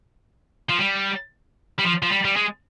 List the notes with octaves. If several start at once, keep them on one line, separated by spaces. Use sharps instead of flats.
F3
G3
G3
F3
F3
G3
G3
G#3